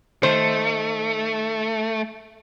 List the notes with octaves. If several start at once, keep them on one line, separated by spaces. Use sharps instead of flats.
D#3 A3 C5